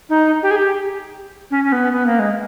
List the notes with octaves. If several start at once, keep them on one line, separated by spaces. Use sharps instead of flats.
D#4
G4
G#4
G4
C#4
C#4
B3
B3
A#3
G#3